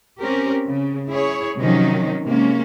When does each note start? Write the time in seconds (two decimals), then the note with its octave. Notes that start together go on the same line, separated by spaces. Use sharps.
0.20 C4 C#4 G4 A#4
0.66 C#3
1.09 E4 G#4 C#5
1.57 C3 D#3 F3 F#3 C#4 D#4
2.23 C3 G#3 A#3 C#4